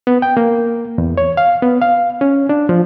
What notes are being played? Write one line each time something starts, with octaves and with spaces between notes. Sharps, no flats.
B3
G5
A#3
E2
C#5
F5
B3
F5
C#4
D4
F3